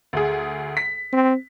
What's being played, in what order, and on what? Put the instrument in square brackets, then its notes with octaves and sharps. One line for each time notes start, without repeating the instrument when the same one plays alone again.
[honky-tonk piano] D2 G#4
B6
[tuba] C4